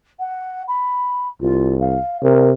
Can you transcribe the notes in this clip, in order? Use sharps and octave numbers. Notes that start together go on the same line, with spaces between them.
F#5
B5
C2 F4
F5
C3 A#4